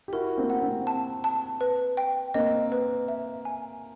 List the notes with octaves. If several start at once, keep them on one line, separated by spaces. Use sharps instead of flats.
G4
E4 F#4 A#4
A#3 C4
F#5
A#3 C4
A5
A5
B4
G5
A#3 C4 D#5
B4
E5
G#5